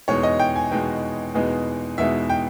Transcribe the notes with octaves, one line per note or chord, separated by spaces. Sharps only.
E2 B2 G#3 B3 D#4 C#5
D#5
G5
G#5
E2 B2 G#3 B3 D#4 G5
E2 B2 G#3 B3 D#4
E2 B2 G#3 B3 D#4 E5
G5